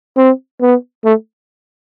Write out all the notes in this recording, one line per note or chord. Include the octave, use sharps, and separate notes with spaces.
C4
B3
A3